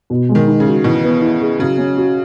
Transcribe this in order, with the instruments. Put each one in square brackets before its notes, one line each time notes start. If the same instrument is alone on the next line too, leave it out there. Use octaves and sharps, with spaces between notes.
[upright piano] B2
G#3
[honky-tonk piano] D#3
[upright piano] D#4
[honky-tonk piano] C#3
[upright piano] F#4
[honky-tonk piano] B2 [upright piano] E3
[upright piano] B3
E4
G#4
[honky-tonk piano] C#3 [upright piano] F#3
[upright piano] C#4
F#4